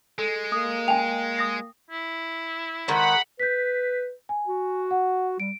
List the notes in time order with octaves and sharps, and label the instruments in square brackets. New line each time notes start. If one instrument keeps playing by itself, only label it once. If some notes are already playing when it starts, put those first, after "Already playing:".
[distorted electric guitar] G#3 [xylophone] A4
[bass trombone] A#3 [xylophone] D#6
[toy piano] G5 G#5 [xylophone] F7
[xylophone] D#6 A#6 C7
[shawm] E4
[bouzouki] D#3 G#3 C5 [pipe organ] F#5 B5
[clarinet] B4 [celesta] G6 B6
[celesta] G#5
[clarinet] F#4
[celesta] F#5
[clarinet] G3 [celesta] D7